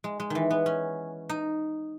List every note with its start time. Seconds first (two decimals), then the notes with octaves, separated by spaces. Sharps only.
0.04 G#3
0.20 G#3
0.30 D#3 E3
0.51 B3
0.66 C#4
1.29 D#4